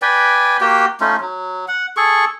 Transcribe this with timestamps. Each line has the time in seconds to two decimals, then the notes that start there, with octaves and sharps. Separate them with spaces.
0.02 B4 D5 G5 G#5
0.61 A#3 F#4 G4 G5
1.01 A3 C#4 D#4 F4
1.20 F#3
1.68 F#5
1.97 G#4 A4 C#6